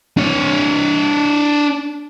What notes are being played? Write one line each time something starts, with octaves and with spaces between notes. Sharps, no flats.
D4 C#5